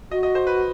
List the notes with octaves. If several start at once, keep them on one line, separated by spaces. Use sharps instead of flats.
F#4 D#5
D#5
C5
B4